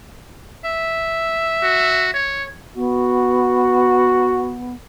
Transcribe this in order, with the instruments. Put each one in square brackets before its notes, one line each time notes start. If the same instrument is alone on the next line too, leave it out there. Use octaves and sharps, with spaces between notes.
[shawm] E5
[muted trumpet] F#4
C#5
[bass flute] B3 [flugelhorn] F#4